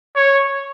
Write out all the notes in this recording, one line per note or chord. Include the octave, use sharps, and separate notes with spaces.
C#5